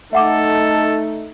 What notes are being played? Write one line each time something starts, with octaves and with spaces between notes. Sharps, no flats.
A3 D#4 A4 E5 F#5 D6